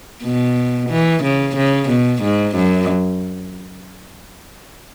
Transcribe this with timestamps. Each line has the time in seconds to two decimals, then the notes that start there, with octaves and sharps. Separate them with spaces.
0.23 B2
0.90 E3
1.23 C#3
1.56 C#3
1.89 B2
2.22 G#2
2.55 F#2